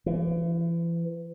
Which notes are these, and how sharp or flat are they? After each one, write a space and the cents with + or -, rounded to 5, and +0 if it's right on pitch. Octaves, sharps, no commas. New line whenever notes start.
E3 +35